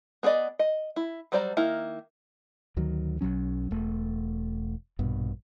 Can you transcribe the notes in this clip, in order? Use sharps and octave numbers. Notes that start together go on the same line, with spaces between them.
B3 G#4 A#4 D5 D#5
D#5
E4
F#3 G3 C5 D5 A#5
D#3 A#3 E4
D2 D#3 F#3
B1 E2 F#3 C#4
E1 A3
A#1 G2 B2